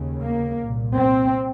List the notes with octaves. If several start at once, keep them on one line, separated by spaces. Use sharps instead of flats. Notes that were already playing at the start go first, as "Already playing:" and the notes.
Already playing: D#2 C#3
A#3
C2 A#2
C4